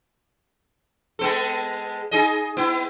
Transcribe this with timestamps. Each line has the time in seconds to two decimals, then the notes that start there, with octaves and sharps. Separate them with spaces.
1.19 G#3 B3 A4
2.11 D#4 G#4 D#5
2.57 B3 E4